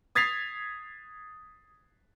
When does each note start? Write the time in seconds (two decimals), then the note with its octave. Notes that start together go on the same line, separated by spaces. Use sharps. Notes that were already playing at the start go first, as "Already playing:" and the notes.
0.15 D#6 G#6 A6 B6 C7 F7